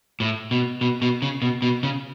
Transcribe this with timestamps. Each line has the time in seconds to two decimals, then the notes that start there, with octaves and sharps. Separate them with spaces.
0.20 A2
0.51 B2
0.81 B2
1.02 B2
1.22 C#3
1.42 B2
1.62 B2
1.83 C#3